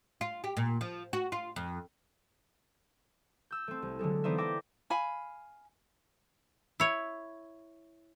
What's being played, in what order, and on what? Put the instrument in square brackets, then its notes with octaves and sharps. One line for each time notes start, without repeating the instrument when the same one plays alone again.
[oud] F4
G4
A#2
F3
F#4
F4
F2
[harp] E6 G6
A3 C4
C2
D3 F#3 G#3 A4
E3 B3 D#4 C5 D5 E5
E5 G5 D6 A#6
[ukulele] F5 G#5 B5
[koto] E4 C#5